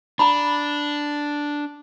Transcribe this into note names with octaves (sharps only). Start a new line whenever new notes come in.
D4 A#5 B5